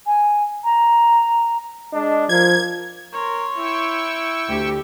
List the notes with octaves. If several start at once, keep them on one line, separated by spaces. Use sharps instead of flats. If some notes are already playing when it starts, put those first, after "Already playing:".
G#5
A#5
G#3 D4 D#5
F3 A#4 G#6
A#4 C#5 C6
E4 G5 C#6 E6
D2 G4